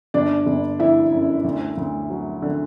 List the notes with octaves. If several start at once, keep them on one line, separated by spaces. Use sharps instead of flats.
G1 D4 D5
G1
D3 E4 E5
F#2
D2
D2
F#3
D3